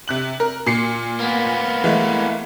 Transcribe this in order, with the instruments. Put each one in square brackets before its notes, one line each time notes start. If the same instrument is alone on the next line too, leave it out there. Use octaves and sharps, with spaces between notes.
[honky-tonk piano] C3 F#6 F#7
A#4
A#2 C7 C#7
[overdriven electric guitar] A#3 B3
[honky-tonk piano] E3 G#3 A3